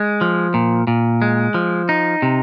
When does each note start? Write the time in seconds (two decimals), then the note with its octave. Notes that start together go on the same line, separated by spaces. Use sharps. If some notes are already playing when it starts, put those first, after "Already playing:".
Already playing: G#3
0.21 F3
0.54 A#2
0.87 A#2
1.22 G#3
1.54 F3
1.89 D#4
2.22 C3